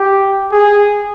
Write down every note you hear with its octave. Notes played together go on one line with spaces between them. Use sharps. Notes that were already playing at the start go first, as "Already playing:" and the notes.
Already playing: G4
G#4